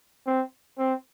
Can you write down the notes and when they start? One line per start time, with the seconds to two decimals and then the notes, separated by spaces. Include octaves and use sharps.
0.27 C4
0.78 C4